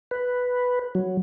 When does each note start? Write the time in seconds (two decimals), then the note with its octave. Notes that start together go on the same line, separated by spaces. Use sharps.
0.11 B4
0.95 F#3